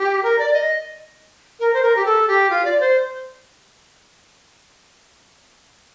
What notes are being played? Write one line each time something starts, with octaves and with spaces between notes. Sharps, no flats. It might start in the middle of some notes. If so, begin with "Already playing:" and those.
Already playing: G4
A#4
D5
D#5
A#4
C5
A#4
G4
A4
G4
F4
D5
C5